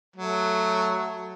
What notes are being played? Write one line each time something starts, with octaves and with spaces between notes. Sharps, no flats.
F#3 A3